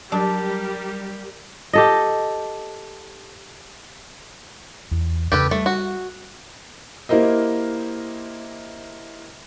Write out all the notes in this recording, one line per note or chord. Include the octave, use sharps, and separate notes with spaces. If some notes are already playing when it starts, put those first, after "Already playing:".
F#3 G3 D4 G4 A#4
G4 A4 D#5
E2
E2 C#3 G4 A4 B4
G3 A3
F#4
A#3 E4 G4 A#4 C5 D#5